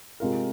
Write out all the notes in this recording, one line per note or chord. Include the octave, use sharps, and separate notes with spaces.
C3 G#3 F4 A#4